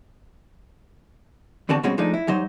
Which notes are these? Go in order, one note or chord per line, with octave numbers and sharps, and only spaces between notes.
E2 D3 C4 F#4 A5
B2 G3 G#3 C4 C#4 F#4
F3 G#3 A3 D4 D#4
E4
G2 F#3 D#4 C5